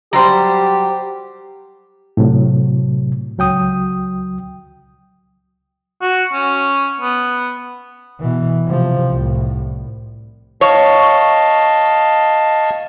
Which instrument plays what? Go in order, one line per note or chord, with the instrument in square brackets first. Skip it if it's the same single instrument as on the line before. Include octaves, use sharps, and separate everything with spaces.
[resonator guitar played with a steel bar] F#3 G3 C5 [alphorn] G4
[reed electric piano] A2 C3 F#3
C#2 F#3 G5 D#6
[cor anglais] F#4
C#4
B3
[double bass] B2 E3
C3 F3
C2 A2
[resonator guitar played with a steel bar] C#5 [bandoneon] D#5 F5 A5